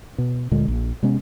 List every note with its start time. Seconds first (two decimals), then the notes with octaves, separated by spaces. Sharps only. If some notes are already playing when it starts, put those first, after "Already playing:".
0.18 B2
0.51 D2 A#2 D3 G#3
0.68 A#1
1.03 C3 G#3 B3 C#4